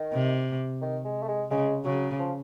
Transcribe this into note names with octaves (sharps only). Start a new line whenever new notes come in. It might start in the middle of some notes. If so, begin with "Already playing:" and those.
Already playing: D#3
C3
D#3
G#3
A3
G#3
C#3 G#3
C#3 F#3
F3